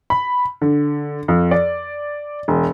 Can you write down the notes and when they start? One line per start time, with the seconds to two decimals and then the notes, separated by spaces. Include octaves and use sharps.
0.10 B5
0.62 D3
1.28 F2
1.51 D5
2.48 E1